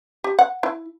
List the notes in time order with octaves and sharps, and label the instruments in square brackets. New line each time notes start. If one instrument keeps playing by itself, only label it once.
[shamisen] G4
F#5
E4